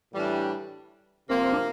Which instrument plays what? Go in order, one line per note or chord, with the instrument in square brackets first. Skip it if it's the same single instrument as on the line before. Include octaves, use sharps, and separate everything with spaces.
[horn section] A2 E3 G3 D4
[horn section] C3 F3 A#3 [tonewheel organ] C4
[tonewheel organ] D4